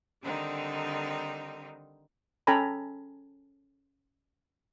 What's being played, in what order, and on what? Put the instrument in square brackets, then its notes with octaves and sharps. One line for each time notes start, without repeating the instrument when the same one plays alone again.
[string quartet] D3 D#3 G3 C4 D#4
[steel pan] C#4 A4 G5 G#5 A#5 B5